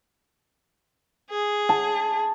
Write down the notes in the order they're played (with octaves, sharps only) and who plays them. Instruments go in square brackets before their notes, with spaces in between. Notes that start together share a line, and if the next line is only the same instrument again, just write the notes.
[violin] G#4
[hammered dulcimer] A5